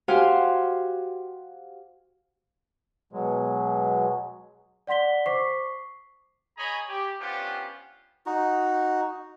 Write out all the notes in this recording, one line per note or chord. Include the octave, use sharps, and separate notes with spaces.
F#4 G4 C5 F5 G#5 C6
B2 F#3 G#3
D5 F#5 C6 B6 G7
C5 C#6 D6 B6 C7
G#4 C#5 D#5 G#5 A#5 B5
G4
B3 C#4 D4 F4 G4 C5
D#4 F#4